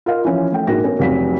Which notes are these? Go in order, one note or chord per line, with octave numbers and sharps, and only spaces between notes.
F4 A#4 D#5 F5
E3 F3 C#4
A3 G5
A#1 G#2 F#4 A#4 A#6
B3 C#4 A#4 C#5
F1 F2 F#3 F5 B6